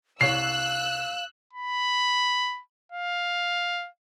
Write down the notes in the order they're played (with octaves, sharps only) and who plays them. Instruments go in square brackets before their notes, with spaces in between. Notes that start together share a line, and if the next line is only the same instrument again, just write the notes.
[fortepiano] C2 C#5 [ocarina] F5 [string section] E6 F#6 [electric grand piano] C7
[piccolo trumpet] B5
F5